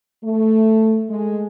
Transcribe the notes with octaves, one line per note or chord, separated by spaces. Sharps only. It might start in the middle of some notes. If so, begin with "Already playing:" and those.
A3
G#3